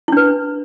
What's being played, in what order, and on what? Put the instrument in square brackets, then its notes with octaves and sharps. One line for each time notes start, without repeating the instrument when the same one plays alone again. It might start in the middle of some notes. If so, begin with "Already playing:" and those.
[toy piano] E4
D4
B4